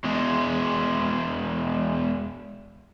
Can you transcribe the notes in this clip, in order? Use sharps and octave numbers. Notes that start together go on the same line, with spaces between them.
E2 G#3